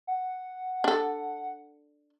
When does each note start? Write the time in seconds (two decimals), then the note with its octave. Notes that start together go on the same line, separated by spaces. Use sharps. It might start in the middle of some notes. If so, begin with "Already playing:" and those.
0.07 F#5
0.84 D4 A4